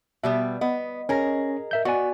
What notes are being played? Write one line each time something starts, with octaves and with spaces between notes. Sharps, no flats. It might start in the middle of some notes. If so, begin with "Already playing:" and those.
B2 G3 B3 E5
B3 D#5
C#4 G#4 A#4 A#6
A#4 E5 G6
B3 F#4 D5 G#5